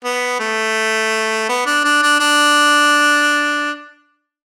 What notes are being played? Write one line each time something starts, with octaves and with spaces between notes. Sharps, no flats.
B3
A3
B3
D4
D4
D4
D4